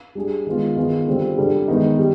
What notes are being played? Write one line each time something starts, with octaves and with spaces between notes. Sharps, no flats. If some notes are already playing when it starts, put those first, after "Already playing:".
G3 D4 G#4
D#3 G#3 B3 F4
D#3 B3 F4 G#4
D3 G3 C4 F4
D3 G3 D4
D#3 G#3 B3 D#4
G3